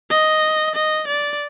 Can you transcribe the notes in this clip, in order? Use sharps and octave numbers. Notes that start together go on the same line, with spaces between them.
D#5
D#5
D5